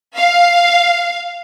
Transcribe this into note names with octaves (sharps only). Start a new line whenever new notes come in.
F5